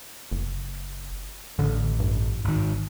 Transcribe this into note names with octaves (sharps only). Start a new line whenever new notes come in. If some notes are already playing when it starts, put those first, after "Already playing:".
F#1
A1 D3
G2
G#1 D#3